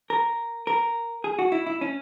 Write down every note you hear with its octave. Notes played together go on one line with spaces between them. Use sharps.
A#4
A#4
G#4
F#4
E4
E4
C#4